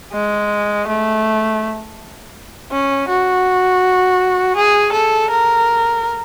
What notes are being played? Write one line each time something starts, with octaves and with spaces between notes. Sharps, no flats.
G#3
A3
C#4
F#4
G#4
A4
A#4